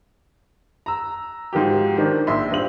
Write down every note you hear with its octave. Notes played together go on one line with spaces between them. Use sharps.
A#5 E6
G#2 F3 F#4 G4
D#3 C4 D4
A#1 E5 C6
G2 C4 F4 F#7